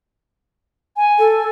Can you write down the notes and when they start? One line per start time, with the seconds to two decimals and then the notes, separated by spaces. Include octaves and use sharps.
0.97 G#5
1.19 A4